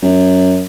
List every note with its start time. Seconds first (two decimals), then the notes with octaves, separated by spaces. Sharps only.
0.02 F#2